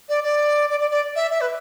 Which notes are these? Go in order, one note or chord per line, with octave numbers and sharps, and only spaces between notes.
D5
D5
D5
D5
D5
E5
E5
B4